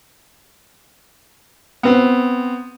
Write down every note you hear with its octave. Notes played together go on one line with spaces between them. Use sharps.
B3 C4